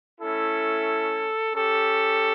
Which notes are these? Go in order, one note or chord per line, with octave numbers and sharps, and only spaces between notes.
A3 C#4 E4 A4
C#4 G4 A4